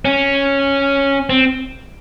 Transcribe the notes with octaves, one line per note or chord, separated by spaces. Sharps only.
C#4
C4